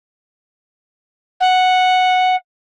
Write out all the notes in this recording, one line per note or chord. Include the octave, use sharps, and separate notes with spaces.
F#5